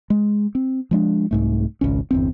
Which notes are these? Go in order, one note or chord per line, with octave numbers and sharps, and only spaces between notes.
G#3
C4
F3 G#3 D4
C2 G#2 A3
G#1 C#2 C#4
G1 E2 C4